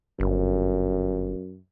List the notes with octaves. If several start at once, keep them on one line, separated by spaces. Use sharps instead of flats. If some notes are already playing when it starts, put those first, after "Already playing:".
G1 F#2